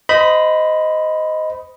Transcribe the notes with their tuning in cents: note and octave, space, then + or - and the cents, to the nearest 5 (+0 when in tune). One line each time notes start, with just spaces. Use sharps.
C5 -25 D#5 +5 B5 +0